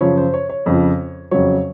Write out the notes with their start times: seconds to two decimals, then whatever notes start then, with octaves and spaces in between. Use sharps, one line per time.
0.01 F#2 C#3 F3 C#5
0.17 C5
0.34 C#5
0.49 C#5
0.66 F2 C#3 F3
1.31 F2 C#3 F#3 C#5